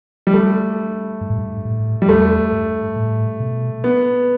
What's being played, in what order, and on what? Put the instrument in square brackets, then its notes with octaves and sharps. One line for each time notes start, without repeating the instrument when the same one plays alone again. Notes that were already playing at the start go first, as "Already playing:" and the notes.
[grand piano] G3
A3
[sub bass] G2
A2
G2
A2
[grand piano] G3
[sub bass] E2 [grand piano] A3
[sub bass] G2
A2
B2
[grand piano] B3